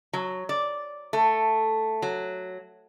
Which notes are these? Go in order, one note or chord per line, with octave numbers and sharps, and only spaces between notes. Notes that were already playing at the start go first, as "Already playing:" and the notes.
F#3
D5
A3
F#3